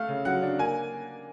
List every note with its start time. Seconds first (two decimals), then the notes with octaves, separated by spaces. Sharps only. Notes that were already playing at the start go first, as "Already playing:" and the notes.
Already playing: A3 F5
0.09 C#3
0.25 F#3 F#5
0.43 D4
0.59 A#3 G#5